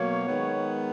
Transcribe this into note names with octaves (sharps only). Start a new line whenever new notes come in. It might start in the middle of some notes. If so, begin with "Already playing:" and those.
Already playing: B2 F#3 A#3 C#5
D#3 G#3 B3